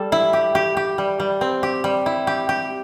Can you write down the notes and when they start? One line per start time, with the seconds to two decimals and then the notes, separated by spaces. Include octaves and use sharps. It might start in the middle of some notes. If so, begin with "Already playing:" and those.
Already playing: G3 A4
0.12 E4
0.33 G4
0.55 G4
0.77 G4
0.98 G3
1.20 G3
1.41 C4
1.63 G4
1.84 G3
2.06 E4
2.27 G4
2.49 G4